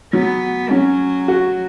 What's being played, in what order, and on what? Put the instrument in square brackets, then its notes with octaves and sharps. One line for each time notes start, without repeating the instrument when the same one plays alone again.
[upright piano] F#3 [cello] B3
[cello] F#3 [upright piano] C#4
[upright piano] F#4